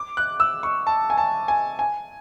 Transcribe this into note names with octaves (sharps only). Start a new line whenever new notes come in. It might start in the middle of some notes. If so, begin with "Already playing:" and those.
Already playing: D6
F#6
E6
C#6
A5
G#5
A5
G#5
G#5